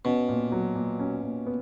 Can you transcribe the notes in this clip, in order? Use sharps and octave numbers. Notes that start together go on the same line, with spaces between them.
B2 C#4
A#2
F#3
A#2
C#4
A#2
B3